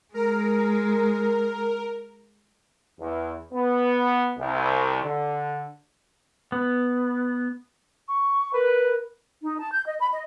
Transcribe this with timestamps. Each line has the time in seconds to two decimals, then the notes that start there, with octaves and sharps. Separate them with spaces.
0.14 G#3 A#4
3.00 E2
3.54 B3
4.39 C2
5.03 D3
6.52 B3
8.08 C#6
8.54 A#4 B4
9.41 D#4
9.58 A5
9.72 G6
9.86 D#5
9.98 B5
10.12 D#5